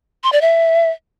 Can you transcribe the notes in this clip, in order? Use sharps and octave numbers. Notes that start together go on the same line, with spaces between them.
C6
D5
E5